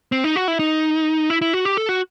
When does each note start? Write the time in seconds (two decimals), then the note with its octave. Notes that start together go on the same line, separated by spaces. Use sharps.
0.12 C4
0.24 D#4
0.36 F#4
0.48 E4
0.59 D#4
1.30 E4
1.42 E4
1.53 F#4
1.65 G4
1.77 A4
1.89 F#4